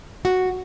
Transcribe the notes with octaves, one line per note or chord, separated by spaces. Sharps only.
F#4